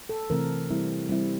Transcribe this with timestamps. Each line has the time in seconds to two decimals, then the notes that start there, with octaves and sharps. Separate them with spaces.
0.09 A4
0.30 C3 E3 A3 C4 A#4
0.70 G3 C4 E4
1.09 G3 C4 E4